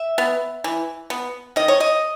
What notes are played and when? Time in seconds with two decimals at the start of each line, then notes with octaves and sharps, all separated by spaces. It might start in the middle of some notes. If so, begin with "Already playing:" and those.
Already playing: E5
0.18 B3
0.64 E3
1.10 B3
1.56 D#3 D#5
1.68 C#5
1.80 D#5